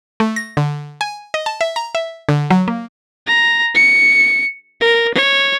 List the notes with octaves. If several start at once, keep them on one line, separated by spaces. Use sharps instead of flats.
A3
A#6
D3
G#5
D#5
A5
E5
A#5
E5
D3
F#3
A#3
A#5
C#7
A#4
C#5